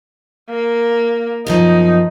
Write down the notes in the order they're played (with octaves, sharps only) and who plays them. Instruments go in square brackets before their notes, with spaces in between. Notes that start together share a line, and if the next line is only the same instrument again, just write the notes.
[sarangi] A#3
[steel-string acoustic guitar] F#2 B2 F3 [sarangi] D#4